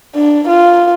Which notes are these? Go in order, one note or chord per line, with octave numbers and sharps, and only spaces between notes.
D4
F4